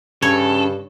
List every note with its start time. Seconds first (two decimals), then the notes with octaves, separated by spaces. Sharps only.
0.22 G2 C#3 A4 C#5